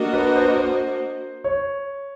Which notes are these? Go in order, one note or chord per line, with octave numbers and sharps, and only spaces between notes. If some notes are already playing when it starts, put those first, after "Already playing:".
Already playing: A#3 D4 F#4 A#4 D#5
B4
C5
C5
C#5